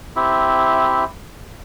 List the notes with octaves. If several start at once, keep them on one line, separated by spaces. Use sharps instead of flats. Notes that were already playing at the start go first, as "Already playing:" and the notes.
C4 E4 G4 E5